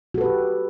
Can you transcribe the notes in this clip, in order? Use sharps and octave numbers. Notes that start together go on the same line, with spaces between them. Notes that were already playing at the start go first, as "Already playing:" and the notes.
F#4 G4 A4 B4